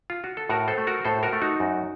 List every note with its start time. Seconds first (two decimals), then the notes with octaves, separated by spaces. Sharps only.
0.10 F4
0.24 F#4
0.37 A4
0.49 A2 F#4 A#4
0.68 A4 C5
0.78 A3
0.87 F#4 A#4
1.05 A2 A4 C5
1.23 F#4 A#4
1.33 A3
1.42 D#4 F#4
1.60 F#2